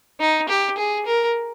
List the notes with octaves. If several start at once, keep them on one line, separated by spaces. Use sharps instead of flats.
D#4
G4
G#4
A#4